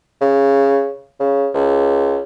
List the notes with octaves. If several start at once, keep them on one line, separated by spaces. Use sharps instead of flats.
C#3
C#3
C#2